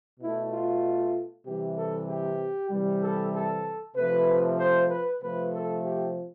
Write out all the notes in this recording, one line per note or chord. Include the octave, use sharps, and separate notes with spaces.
B2 A3 E4
F4
C3 E3 G3 G4
A4
G4
C3 E3 G3
A4
A4
C3 F3 A3 B4
C5
B4
C3 F3 A3 B4
A4
G4